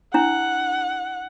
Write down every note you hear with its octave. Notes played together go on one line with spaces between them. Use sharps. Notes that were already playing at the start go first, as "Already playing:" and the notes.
D4 E4 F#5